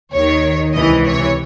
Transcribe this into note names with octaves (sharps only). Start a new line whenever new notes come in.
D#2 D#3 C#5
C#2 C3 E3 D#5
C#5